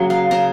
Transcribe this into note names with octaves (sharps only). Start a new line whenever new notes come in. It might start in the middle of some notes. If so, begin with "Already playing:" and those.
Already playing: C#3 F#3 A#3
F5
C#3 A#5